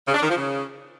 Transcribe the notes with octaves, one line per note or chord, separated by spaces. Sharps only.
C#3
D4
D#3
F3
C#3